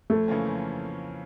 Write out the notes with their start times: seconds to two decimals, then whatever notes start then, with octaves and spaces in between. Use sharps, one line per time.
0.10 F2 A3
0.28 C#3 E3 A#3 C#4
0.46 F2